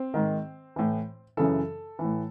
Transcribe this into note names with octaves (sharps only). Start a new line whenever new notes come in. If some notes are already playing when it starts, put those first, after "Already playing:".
Already playing: C4 C5
G#2 D#3
A2 E3
F#2 C#3 E3 A4
E3
A2